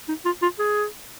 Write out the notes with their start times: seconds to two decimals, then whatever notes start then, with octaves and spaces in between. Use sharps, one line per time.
0.08 D#4
0.25 F4
0.42 F4
0.59 G#4